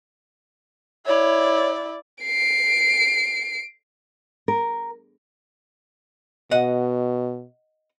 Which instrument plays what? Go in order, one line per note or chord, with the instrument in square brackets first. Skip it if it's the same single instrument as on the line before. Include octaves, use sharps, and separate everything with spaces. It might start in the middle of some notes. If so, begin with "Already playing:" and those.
[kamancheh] E4 D5 [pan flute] C#5
[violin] C7 D7
[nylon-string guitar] A#4
[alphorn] B2 [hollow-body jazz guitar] D#5 F#5